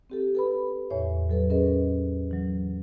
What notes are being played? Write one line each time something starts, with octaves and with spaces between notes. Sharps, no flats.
C4 G4 A4
A4 B4 B5
E2 A2 C#5 E5
F#3 A4 B4
C#4 G#4 A#4 B4 D#5
E3 F#3